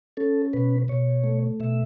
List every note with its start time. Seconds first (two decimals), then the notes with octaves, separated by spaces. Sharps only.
0.17 C#4 A4
0.53 B2 B4
0.88 B2 C#5
1.24 A3
1.60 B2 E5